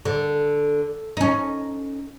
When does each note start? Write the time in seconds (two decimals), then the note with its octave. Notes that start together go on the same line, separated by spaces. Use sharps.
0.05 D3
1.17 C#4 D#4